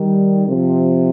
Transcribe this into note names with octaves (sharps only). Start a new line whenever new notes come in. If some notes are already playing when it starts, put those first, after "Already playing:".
Already playing: D#3 G3
C3 F3